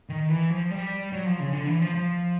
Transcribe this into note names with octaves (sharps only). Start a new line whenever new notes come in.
D#3
E3
F3
G3
F#3
F3
C#3
D3
E3
F3
F3